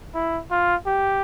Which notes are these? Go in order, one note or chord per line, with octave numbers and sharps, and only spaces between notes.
E4
F4
G4